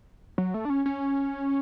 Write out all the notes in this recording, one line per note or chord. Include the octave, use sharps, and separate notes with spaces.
F#3
A3
D4
C#4
C#4